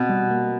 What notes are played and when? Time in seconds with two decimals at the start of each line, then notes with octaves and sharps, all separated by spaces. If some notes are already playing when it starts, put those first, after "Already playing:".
Already playing: B2 C4
0.09 G3
0.30 A#3